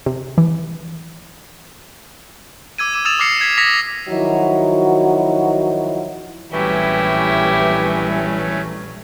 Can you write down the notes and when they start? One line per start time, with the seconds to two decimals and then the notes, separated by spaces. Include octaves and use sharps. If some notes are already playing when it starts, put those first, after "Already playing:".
0.06 C3
0.38 E3
2.78 D6 E6 G#6 D#7
2.94 D6 E6 D#7 E7
3.05 D#6 E6 A6 E7 F7
3.19 D6 F6 A#6 C7 C#7
3.41 G#6 B6
3.57 D#6 A#6 B6 C#7 F7
4.09 D#3 F3 F#3 E4 F#4 D#5
6.52 A#1 E3 F#3 G3 A3 C#4 E4 G4